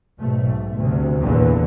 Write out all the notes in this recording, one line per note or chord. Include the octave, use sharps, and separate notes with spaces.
B1 G#2 A3
D2 C3
A1 E2 A#2 D3 E3